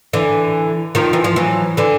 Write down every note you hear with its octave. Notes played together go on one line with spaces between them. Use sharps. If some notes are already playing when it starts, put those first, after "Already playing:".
D3 E3
D#3 F3
E3
F3
E3 F#3
D3 E3